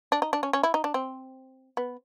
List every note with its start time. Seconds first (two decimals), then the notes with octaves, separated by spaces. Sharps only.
0.12 D4
0.22 D#4
0.33 D4
0.43 C#4
0.53 C#4
0.63 E4
0.74 D#4
0.84 D4
0.94 C4
1.77 B3